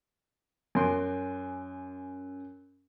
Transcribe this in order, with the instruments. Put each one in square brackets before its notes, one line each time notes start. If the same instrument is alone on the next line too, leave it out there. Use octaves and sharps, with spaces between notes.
[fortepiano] F#2 C6 [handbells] C#4